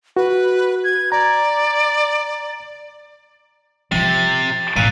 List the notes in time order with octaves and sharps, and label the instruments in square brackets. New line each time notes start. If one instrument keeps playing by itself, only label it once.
[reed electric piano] F#4 [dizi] B4
[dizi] G#6
[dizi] D5 [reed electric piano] A#5
[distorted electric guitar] C3 [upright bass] F3 F4 [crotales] A6
[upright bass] G#1 [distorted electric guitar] A#2 [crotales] F#6 D#7